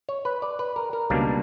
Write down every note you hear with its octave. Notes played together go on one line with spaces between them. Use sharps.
C#5
B4
D5
B4
A#4
A#4
C#2 B2 G3 A#3 D4